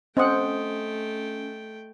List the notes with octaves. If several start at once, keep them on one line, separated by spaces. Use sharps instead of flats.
A3 C4 C#4 D#5 F#5 G5 C6 D#6